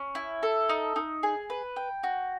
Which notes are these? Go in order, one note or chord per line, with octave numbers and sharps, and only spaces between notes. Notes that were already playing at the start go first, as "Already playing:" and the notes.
Already playing: C#4
E4
A4
D#4
D#4
G#4
B4
G5
F#4